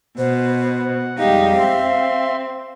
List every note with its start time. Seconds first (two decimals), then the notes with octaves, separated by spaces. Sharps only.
0.18 B2 C5 F#5
1.18 F2 G3 G#3 D#4 G4 F5
1.58 C4 E5 C6